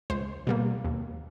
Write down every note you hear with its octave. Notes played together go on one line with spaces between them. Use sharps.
C#2 C5
B2 G3 A#3
D#2